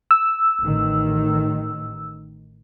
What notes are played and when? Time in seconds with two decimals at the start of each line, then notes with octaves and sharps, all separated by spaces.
0.11 E6
0.61 A1 D#3